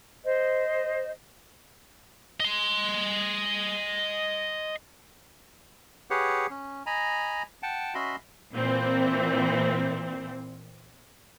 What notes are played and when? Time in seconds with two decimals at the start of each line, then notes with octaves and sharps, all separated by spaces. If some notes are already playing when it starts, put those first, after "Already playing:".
0.24 C5 D#5
2.40 D#5 C6
6.10 G4 G#4 B4 C#5 F#5
6.50 C#4
6.86 D#5 G#5 A#5 B5
7.63 F#5 G5 A5
7.94 C#4 F#4 D#5 E5 B5 C6
8.54 A#2 E3 C4